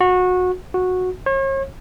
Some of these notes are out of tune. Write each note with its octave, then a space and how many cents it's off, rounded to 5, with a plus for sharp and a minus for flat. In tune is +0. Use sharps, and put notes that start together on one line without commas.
F#4 -20
F#4 -10
C#5 -40